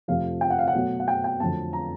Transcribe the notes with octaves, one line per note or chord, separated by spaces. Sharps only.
F2 C3 F3 A3 F5
G5
F#5
F5
F#5
B2 F#3 A3
F#5
G5
G5
F2 D3 F#3 A3 A5
A#5